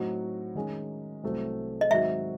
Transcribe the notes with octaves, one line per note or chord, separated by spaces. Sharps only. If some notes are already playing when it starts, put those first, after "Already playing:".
Already playing: A2 F#3 C4 D#4 F#4
D#3 G#3 C#4
C2 C3 F#3 A3 C4
D#5
G#2 D#3 F#3 C4 F#4 E5